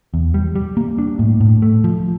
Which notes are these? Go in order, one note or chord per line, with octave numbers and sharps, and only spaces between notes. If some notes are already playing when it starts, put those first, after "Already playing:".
E2
G3
G3
A#3
D4
A2
A2
A3
F3